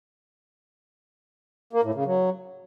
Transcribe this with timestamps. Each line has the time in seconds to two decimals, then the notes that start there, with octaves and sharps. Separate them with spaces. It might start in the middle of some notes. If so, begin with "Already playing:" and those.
1.73 A#3
1.84 A2
1.94 C#3
2.05 F#3